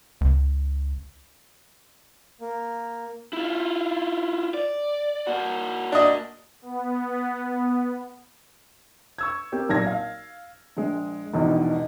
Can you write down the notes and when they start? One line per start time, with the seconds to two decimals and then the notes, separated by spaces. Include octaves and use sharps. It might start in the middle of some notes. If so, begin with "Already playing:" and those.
0.21 C#2
2.41 A#3
3.33 E4 F4
4.54 D5
5.27 A#3 F#4
5.92 D4 D#5
6.62 B3
9.18 C#6 E6 G#6
9.52 A#3 C4 G4
9.69 B1 A#2 A#4 A5 G#6 A#6
9.87 F5
10.77 A#1 G#3
11.33 A#1 E2 G#2 B2